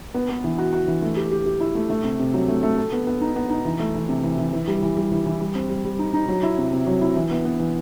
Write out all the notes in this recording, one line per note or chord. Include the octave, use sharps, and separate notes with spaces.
B3
B3
E3
F#4
F#4
E3
A3
G4
G4
G4
E4
A3
A3
C3
C3
F#3
A3
A3
A4
B3
B3
D#4
B3
D#4
E3
A3
E3
C3
E3
E3
E3
G3
E3
G3
E3
E3
G3
C4
G3
G3
D#4
D#4
F#3
E4
C3
C3
F#3
E4
E3
B3
B3
E3